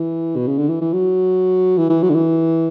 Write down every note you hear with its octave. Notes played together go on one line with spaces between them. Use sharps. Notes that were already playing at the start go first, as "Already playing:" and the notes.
Already playing: E3
B2
C#3
D3
E3
E3
F#3
E3
E3
F#3
D3
E3